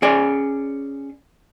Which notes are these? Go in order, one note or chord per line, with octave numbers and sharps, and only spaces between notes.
C#4 G#4 D5 G#5